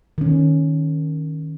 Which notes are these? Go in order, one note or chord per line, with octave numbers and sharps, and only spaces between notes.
D#3 C#4